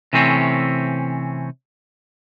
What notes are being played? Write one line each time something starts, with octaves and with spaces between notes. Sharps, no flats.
C3 E3 A3 C4 C#4